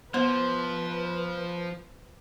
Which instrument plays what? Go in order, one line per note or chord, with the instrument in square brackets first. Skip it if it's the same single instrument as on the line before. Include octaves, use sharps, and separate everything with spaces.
[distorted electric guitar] F3 [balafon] B3 [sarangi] B4 [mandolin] C5